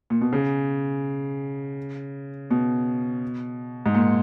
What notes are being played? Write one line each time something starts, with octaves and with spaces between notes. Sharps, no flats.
A#2
B2
C#3
B2
G#2
A#2